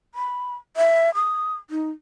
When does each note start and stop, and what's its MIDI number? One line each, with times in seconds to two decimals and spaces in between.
0.15 0.55 83
0.77 1.14 76
1.15 1.54 87
1.70 1.91 63